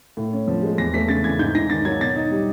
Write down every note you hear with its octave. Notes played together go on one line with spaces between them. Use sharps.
A2
C#4
F3
G#3
E2 A#6
A3 B6
C#3 A6
E3 G#6
G#2 G6
G#2 A#6
D#3 A6
F#3 G#6
B2 A6
D#4
G3